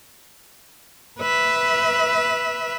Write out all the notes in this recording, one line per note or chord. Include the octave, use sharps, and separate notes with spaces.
B4 E5